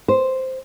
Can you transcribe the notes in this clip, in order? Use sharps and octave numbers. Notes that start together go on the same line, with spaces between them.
C5